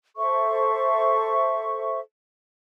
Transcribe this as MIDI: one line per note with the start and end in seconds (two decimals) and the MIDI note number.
0.17 1.99 69
0.17 1.99 72
0.17 1.99 76
0.17 1.99 85